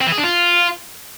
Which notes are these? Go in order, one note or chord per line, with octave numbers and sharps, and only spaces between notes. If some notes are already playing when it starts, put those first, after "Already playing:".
C4
E3
G#4
D4
F4